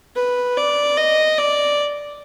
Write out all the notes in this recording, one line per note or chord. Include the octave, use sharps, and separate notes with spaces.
B4
D5
D#5
D5